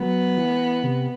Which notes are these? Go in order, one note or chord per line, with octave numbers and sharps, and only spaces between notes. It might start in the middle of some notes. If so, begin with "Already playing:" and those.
Already playing: F#3 B3
E3
C3